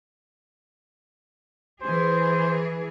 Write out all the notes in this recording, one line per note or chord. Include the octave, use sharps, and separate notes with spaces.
E3 G#4 C5